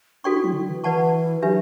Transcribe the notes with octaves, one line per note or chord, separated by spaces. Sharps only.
D4 F#4 A4 D5 G5 C#6
E4
F#3
D3
E3
E3 B4 D5 F#5 A5 C#6
F#3 D4 G4 B4 E5